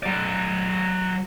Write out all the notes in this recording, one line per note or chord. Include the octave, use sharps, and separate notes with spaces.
F#3 D5